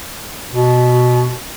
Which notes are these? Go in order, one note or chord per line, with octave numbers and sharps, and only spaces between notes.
B2